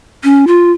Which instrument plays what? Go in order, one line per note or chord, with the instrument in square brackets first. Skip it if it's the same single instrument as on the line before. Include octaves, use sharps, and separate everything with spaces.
[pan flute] C#4
F4